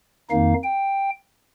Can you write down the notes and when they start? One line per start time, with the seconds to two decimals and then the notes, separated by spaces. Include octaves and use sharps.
0.30 F2 D#3 A#3 D#4 F5
0.64 G5